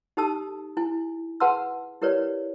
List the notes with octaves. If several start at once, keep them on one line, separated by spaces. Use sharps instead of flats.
D#4 G4 A4 A5 D#6 E6
E4 G#5
G#4 B4 F#5 A5 C6 E6
E4 G4 A#4 B4 C#5 D5